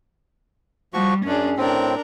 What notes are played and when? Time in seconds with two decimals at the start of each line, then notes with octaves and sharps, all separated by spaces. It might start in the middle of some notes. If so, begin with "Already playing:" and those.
0.94 F3 G3 F#4 C#6
1.25 F#2 C#4 D4 G#4
1.58 A2 C4 D4 A#4